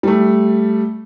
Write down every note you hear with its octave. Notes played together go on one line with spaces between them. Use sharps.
G3 A3